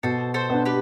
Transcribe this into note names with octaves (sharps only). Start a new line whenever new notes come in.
B2 A4 C5
A4 C5
B3 D4
G4 B4